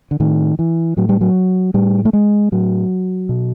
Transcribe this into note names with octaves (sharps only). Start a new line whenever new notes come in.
D3
A2 D#3
E3
A2 F#3
G3
F#3
A2 G3
A3
G#3
A2 F#3
B2